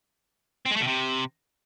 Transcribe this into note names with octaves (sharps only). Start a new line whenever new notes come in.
C4
G#3
A3
B2
C3